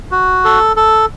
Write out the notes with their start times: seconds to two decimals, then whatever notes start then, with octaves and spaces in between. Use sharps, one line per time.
0.11 F#4
0.45 A4
0.76 A4